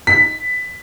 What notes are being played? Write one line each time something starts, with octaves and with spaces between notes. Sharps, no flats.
B6